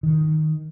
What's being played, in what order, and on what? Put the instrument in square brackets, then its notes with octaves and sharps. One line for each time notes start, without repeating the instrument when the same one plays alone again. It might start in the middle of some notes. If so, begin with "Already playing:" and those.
[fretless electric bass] D#3